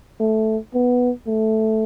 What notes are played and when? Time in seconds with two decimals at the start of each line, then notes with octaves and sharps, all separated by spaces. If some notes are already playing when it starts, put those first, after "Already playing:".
0.20 A3
0.74 B3
1.27 A3